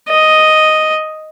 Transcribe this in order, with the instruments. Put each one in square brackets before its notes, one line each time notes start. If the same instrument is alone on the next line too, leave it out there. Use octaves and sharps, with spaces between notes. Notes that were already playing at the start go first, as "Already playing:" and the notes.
[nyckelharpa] D#5